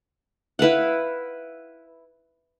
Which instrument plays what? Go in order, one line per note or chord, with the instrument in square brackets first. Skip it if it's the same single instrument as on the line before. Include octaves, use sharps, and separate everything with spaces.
[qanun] E4 B4 F5 F#5